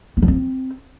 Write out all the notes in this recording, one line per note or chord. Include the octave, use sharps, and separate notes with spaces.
B3
F3
C4